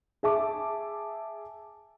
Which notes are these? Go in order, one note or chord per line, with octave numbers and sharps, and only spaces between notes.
G#4 E5 A5 D6